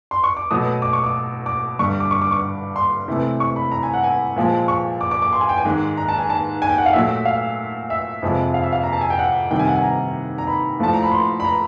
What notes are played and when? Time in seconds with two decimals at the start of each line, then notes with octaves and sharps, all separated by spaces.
0.11 C6
0.24 C#6
0.37 D6
0.51 B2 F#3 A3 D#6
0.82 D6
0.93 C#6
1.03 D6
1.46 D6
1.79 G2 D3 G3 C#6
2.00 D6
2.11 C#6
2.22 D6
2.31 C#6
2.76 C6
3.08 C3 E3 A3
3.40 C#6
3.56 B5
3.72 A#5
3.83 G#5
3.94 F#5
4.04 G#5
4.36 A#2 F3 G#3
4.68 C#6
5.01 D6
5.11 D6
5.22 D6
5.33 C6
5.41 G#5
5.49 G5
5.58 G#5
5.65 G#2 D#3 G#3
5.97 A#5
6.09 A5
6.18 G#5
6.30 A5
6.62 G#5
6.69 G5
6.78 F#5
6.86 F5
6.93 A#2 F#3 A3 E5
7.25 F5
7.90 E5
8.22 F2 C3 F3 G#3
8.54 F5
8.63 E5
8.73 F5
8.83 A#5
8.93 A5
9.01 G#5
9.10 G5
9.19 F#5
9.51 C3 D#3 G3 G5
9.59 G#5
9.68 F#5
9.76 G#5
9.83 A#5
10.38 A#5
10.47 B5
10.80 A2 F3 A3 A5
10.93 A#5
11.03 B5
11.12 C6
11.40 B5
11.44 A#5